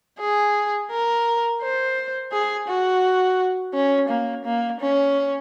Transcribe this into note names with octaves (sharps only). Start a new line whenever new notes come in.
G#4
A#4
C5
G#4
F#4
C#4
A#3
A#3
C#4